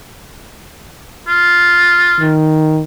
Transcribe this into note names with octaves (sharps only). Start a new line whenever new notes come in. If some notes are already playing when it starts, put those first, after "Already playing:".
F4
D#3